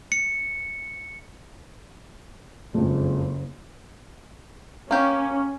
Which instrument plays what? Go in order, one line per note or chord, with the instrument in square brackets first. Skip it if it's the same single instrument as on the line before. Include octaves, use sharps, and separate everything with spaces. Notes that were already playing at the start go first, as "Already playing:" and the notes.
[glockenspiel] C#7
[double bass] F#1 [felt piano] F2 G#3
[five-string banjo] A#3 G4 [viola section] C#4